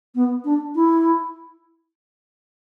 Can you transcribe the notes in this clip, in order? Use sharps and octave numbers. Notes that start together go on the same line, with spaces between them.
B3
D4
E4